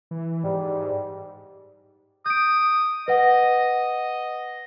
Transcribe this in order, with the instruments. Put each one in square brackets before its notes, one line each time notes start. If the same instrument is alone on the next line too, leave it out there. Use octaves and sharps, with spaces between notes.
[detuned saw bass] E3
[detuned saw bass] G#2 [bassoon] G3
[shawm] D#6 [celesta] G6 D7
[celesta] B4 F#5 [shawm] D#5